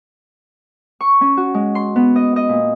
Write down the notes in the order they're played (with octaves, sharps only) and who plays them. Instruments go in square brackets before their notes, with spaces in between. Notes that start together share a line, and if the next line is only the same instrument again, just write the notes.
[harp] C#6
C#4
F#4
G#3
C6
B3
D#5
D#5
A#2